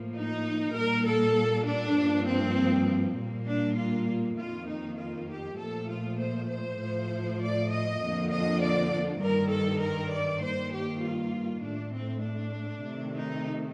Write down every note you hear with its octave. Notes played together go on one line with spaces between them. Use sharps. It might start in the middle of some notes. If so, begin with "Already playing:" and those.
Already playing: A2 F3 A#3
D#4
A#2 G3 A#3 A#4
A4
D4
G2 F3 A#3
C4
A#2 G3 A#3
D4
F4
F2 D#3 A#3 F4
D#4
F4
G4
A#2 F3 A3 A4
F4
C5
C5
A2 F3 A3
D5
D#5
F2 D3 F3 A#3
D#5
D5
G2 D#3 G3 A#4
A4
A#4
D5
G2 D#3 A#3 C5
G4
F4
A2 A3 D4
C4
D4
C3 D#3 A3
D#4